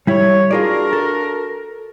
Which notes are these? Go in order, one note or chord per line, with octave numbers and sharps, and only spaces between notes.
G3 E4 C#5
D4 F4 F#4 G#4 A#4 D5
A4